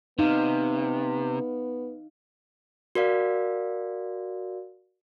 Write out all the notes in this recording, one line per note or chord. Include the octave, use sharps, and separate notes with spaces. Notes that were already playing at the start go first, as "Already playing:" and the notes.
C3 B3 D#4 F5
F#4 A#4 D5 F5